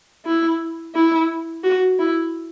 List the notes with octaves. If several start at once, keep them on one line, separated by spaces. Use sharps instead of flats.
E4
E4
F#4
E4